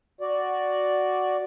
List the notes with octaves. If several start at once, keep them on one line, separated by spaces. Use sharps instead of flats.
F#4 D5